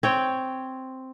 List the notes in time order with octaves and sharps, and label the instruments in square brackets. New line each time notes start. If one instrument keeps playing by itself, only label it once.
[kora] C4 C#5 G5